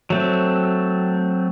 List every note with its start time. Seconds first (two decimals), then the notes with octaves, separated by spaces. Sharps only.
0.10 F#3 A3 C4